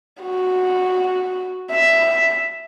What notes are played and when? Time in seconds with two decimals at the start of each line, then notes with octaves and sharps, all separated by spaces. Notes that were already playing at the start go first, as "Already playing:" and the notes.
0.21 F#4
1.71 E5